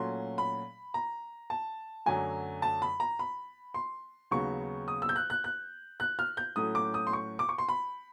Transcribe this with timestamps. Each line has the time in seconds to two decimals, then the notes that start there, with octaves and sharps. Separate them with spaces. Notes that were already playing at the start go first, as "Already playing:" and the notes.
Already playing: A#2 F#3 A3 C#4 C6
0.38 B5
0.94 A#5
1.50 A5
2.06 F#2 D3 F#3 A3 G#5
2.62 A5
2.82 B5
3.00 A#5
3.19 B5
3.74 C6
4.31 D#2 C#3 F#3 B3 C#6
4.88 D#6
5.02 E6
5.09 G6
5.16 F#6
5.30 F#6
5.44 F#6
6.00 F#6
6.19 F6
6.37 G6
6.56 A2 F#3 A3 C#4 D#6
6.75 D6
6.94 D#6
7.07 C6
7.13 C#6
7.39 D6
7.49 C#6
7.58 C6
7.69 B5